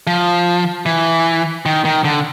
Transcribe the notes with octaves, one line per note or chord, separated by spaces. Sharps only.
F3
E3
D#3
D#3
D3